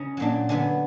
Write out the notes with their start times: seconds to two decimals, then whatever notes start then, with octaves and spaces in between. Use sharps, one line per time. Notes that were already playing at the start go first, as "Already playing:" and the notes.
Already playing: C#3 C#4 A#5
0.17 A#2 F#3 A#3 D4
0.49 D3 F#3 B3 G#5